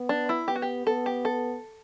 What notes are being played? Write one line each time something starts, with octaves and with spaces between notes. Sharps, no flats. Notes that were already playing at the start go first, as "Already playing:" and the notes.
Already playing: B3
D4
E4
B3 G4
F#4
G4
B3 A4
G4
A4